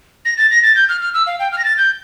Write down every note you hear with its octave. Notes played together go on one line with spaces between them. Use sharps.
A#6
A6
A#6
A6
G6
F6
F6
E6
F5
G5
F6
A#6
A6
G6